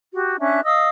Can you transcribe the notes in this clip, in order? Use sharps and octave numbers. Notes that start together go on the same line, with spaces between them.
F#4 G4
C#4 D4 E5 F#6
D#5 F5 D#6 E6